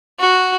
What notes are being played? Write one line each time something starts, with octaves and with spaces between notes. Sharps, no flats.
F#4